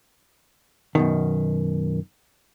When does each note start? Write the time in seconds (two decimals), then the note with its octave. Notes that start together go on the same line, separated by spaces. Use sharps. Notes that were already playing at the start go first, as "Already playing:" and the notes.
0.95 F#2 B2 D#3